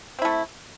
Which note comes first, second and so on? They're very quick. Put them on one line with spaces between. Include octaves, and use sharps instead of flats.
C4 E4 A3